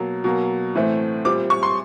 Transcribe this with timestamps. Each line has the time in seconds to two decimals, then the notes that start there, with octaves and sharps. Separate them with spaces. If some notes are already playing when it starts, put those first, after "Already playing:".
Already playing: B2 F#3 A#3
0.24 B2 F#3 A#3
0.75 A2 E3 A3 C4
1.25 A#2 G3 C4 D6
1.50 C#6
1.63 C6